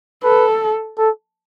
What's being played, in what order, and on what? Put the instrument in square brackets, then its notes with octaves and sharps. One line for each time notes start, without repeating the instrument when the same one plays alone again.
[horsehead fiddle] A4 [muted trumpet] B4
[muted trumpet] A4